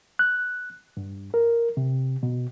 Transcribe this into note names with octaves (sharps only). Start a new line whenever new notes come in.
F#6
G2
A#4
C3
B2